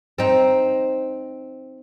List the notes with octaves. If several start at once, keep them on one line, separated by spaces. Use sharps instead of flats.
C4 D#4